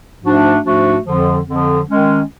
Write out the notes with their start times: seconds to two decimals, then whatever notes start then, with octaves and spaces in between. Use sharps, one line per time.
0.22 G#2 F3 A3 D4 F#4
0.64 G#2 F3 A3 D4 F#4
1.05 F2 D3 F3
1.46 F2 D3 F3
1.88 D#3 G#3 C#4